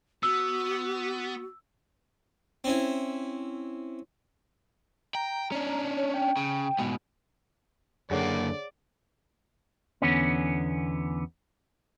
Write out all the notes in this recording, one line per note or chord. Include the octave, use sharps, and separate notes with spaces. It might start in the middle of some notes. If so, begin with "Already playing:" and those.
B3 F#4 E6
C4 C#4 E4
G5 A#5
C#4 D4
C#5
G5
C#3
G#2 B2
F#2 D3 A#3 G#4 C#5 D5 F#5
E2 D3 B3 C#4